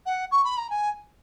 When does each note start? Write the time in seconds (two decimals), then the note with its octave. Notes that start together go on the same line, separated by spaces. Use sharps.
0.06 F#5
0.31 C#6
0.44 B5
0.57 A#5
0.70 G#5